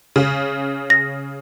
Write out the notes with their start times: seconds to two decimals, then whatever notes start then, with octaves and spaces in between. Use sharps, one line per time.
0.16 C#3
0.90 A#6